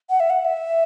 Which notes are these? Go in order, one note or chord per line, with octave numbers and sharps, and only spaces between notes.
F#5
E5
F#5
E5